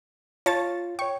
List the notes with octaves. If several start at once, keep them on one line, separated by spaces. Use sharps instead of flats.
F4 C#5 A5 A6
C#5 G5 C#6